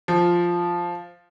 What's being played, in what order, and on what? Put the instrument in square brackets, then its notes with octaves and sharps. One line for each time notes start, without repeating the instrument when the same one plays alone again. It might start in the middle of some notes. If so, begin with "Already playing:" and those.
[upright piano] F3